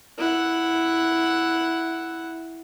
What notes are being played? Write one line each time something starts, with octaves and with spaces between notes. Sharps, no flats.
E4 F#5